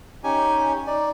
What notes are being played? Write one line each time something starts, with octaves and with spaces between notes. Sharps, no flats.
C#4 D#4 G4 G#5
D#4 D5